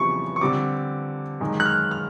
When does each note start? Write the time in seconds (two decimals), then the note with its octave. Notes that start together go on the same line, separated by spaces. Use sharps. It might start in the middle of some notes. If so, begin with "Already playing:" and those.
Already playing: F2 C#3 E3 G3 B3 C#6
0.36 C#6
0.41 D3 G3 C4 D6
1.40 F#2 D#3 G#3
1.60 F#6
1.65 F6
1.91 F6